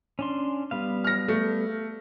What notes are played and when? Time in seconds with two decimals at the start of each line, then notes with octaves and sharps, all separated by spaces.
0.19 C#4 D4 C6
0.71 G3 B3 F5
1.04 F6 A#6
1.28 A3